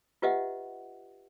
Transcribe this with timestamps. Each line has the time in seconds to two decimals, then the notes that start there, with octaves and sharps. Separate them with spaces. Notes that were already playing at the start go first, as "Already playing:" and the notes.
0.22 F4 G4 B4 D#5 E5 F#5